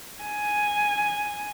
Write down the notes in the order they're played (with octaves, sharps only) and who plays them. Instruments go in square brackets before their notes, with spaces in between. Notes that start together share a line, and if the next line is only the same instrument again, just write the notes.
[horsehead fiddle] G#5